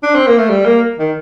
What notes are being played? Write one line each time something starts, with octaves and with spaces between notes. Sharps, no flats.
D4
C4
A#3
A3
G3
A#3
D#3